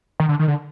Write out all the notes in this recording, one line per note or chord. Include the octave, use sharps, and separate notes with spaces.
D#3
D3
D#3
D3